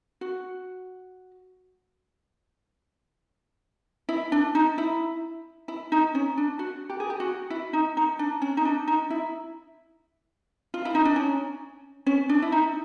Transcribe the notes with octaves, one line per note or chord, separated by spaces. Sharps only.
F#4
E4
D4
D#4
E4
E4
D#4
C#4
D4
F#4
G4
G#4
G4
F#4
E4
D#4
D#4
D4
C#4
D#4
D4
D#4
E4
F4
E4
D#4
D4
C#4
C#4
D4
E4
D#4